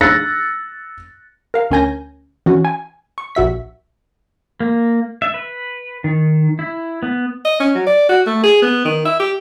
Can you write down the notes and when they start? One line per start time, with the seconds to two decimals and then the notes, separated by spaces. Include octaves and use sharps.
0.01 E6 F#6 A6 A#6 C#7
1.54 A#4 F5
1.71 D2 C#4 A#4 G#5 G6 A#6
2.46 E3 C#4 F#4
2.65 G#5
3.18 C#6
3.35 A#1 F#4 E5 B6
4.60 A#3
5.22 E5
5.34 B4
6.04 D#3
6.59 E4
7.03 B3
7.45 D#5
7.60 C#4
7.75 F#3
7.87 D5
8.09 F#4
8.27 A3
8.44 G#4
8.62 B3
8.85 D#3
9.05 E5
9.20 G4